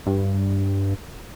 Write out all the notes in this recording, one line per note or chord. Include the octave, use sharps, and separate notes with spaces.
G2